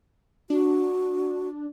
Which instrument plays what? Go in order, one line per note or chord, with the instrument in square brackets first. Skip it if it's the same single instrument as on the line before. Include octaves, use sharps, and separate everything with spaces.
[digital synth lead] D4 [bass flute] F#4